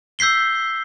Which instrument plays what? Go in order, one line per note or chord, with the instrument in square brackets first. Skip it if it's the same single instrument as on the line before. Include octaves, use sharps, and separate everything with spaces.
[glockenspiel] E6 G6 B6 C7 G7